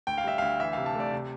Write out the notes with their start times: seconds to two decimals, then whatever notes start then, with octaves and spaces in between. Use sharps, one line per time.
0.07 D2 G5
0.18 F5
0.24 G3 E5
0.38 D2 F5
0.60 E3 E5
0.73 C3 F5
0.86 A5
0.95 A3 D5
1.12 C3